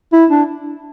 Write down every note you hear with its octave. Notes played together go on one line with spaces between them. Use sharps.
E4
D4